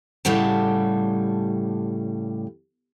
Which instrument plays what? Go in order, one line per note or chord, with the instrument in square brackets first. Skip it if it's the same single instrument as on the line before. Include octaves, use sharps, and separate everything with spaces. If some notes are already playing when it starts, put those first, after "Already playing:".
[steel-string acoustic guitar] A2 C#3 G3 G4 F#5 A5